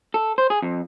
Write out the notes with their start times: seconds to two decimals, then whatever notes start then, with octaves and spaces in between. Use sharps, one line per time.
0.14 A4
0.38 C5
0.50 G#4
0.62 F2